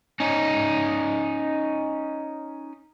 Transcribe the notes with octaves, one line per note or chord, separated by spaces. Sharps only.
C#4 D#4